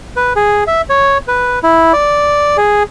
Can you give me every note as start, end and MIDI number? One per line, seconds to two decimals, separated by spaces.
0.16 0.33 71
0.36 0.64 68
0.67 0.81 76
0.90 1.18 73
1.28 1.59 71
1.63 1.93 64
1.93 2.57 74
2.57 2.83 68